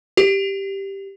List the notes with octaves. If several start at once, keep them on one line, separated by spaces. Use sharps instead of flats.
G4